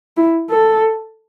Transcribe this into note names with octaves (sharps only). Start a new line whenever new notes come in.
E4
A4